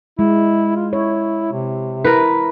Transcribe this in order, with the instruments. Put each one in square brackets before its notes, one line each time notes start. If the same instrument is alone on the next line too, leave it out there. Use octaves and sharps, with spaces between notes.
[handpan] G#3 [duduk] E4
[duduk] F4
[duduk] E4 [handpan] C#5
[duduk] C3
[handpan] E4 [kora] A#4 B4